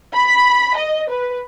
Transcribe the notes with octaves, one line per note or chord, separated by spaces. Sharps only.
B5
D#5
B4